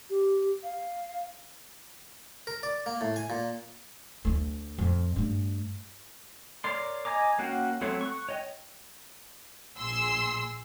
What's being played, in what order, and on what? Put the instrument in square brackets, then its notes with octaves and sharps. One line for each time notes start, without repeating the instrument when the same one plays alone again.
[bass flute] G4
F5
[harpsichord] A#4
D5
A#3
A2
G#5
A#2
[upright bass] D2 A3
F2
G2 A3
[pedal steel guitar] A#4 C#5 D5 C6
D#5 G#5 A#5 D6
A#3 C#4 F#4 F#5 G5
F#3 A3 C4 C#5
C#6 F#6
C#5 D#5 G5
[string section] A#1 A#2 G#4 C6 E6 C7